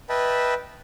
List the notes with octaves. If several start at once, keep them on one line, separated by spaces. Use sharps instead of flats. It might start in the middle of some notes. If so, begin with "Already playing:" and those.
B4 D#5 E5 G5 A5 B5